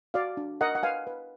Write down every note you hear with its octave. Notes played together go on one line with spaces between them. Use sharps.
F#4 D5 F5
D4
A#4 D#5 F#5
F#5
B4 F5 G#5
B4